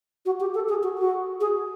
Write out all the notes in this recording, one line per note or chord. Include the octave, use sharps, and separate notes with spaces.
F#4
G4
A4
G#4
F#4
F#4
G#4